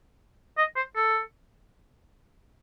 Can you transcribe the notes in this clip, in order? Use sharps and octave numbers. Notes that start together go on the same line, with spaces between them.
D#5
C5
A4